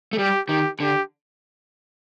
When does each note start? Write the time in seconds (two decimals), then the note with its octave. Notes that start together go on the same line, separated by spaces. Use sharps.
0.13 A3
0.18 G3 G4
0.49 D#3 G4
0.80 D3 G4